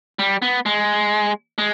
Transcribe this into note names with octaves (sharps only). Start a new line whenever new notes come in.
G3
B3
G#3
G#3